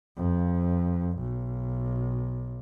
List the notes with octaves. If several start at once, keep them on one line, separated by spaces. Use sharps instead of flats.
F2
B1